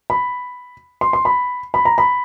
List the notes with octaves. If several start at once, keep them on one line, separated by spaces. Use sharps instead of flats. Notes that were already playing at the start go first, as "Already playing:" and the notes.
B5
C6
C6
B5
B5
A#5
B5